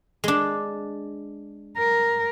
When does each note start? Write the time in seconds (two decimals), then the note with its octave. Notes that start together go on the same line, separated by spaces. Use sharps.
0.24 G#3 D4
1.78 A#4